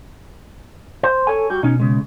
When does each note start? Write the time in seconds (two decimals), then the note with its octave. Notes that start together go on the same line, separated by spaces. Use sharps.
1.03 C5
1.27 A4 C#5 G#5
1.50 G3 F#4 G6
1.63 B2 C#4 D#4
1.80 C#3 G#3